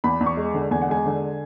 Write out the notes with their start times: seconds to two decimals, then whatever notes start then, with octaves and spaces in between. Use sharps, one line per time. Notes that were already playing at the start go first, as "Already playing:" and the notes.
0.04 E2 B5
0.21 E2
0.26 C#6
0.37 G#3
0.54 D3
0.71 E2 G#5
0.82 F#5
0.89 G#3 G#5
1.06 D3